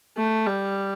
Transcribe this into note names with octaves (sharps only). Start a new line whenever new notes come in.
A3
G3